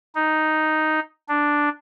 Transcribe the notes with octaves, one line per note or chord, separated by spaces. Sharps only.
D#4
D4